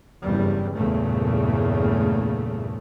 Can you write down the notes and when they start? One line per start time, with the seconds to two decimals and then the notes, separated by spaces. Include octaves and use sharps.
0.22 F#1 E2 G2 G3
0.74 E2 G2 A#2 C#3 A3